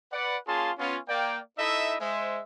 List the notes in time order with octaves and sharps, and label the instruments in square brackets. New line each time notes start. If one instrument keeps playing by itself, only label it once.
[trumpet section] B4 D5 F#5
A#3 C#4 F4 G#4 A5 C6
B3 C#4 F4
A#3 D5 G5
D#4 E4 A4 D#5 E5
G#3 C5 E5